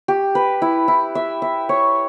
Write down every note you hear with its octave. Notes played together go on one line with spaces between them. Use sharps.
G4
B4
E4
E4
E5
E5
C#5